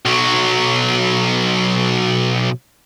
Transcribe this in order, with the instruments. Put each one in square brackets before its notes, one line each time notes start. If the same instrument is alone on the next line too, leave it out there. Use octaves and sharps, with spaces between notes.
[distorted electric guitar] B1 F#3